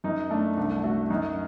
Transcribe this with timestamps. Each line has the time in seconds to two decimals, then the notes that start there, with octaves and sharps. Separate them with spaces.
0.04 F#2 D#4
0.30 A3 D4
0.57 C2 D4
0.84 A3 F#4
1.10 F#2 D#4